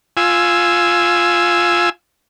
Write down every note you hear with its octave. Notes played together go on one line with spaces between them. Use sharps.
F4 G#5 E6